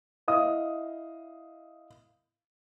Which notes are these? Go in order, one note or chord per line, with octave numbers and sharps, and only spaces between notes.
E4 D#5 F5 D#6